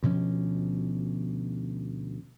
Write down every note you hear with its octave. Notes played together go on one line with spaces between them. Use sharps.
D2 B2 F3 C#4